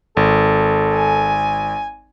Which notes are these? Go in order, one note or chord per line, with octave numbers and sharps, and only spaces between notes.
G#1 A4
G#5